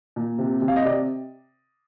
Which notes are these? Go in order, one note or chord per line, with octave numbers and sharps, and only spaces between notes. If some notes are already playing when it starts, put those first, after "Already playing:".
A#2
C3
C3
F5
D#5
C3 D5